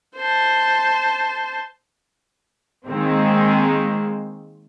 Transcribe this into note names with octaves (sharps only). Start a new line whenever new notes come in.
C5 A5
D#3 G#3 A#3 C4